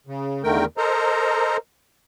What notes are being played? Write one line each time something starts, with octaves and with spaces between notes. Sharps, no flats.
C#3
E2 D3 D#3 A3 A#4 G5
A4 A#4 C5 D#5 A#5